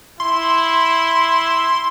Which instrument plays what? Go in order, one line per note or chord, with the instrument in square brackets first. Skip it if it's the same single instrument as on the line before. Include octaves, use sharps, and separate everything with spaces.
[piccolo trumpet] E4 [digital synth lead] C6